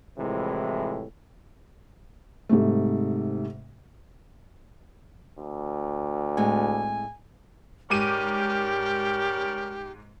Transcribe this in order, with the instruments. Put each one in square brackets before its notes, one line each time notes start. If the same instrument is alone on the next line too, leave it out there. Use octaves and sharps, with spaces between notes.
[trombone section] A2 C3 E3 F3 G#3
[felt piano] G#2 C3 G3 A3
[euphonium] D2
[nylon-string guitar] A2 G#3 C4 [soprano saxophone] G#5
[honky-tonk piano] G#2 D6 D#7 [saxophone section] G3 C#4 A#4 [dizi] G4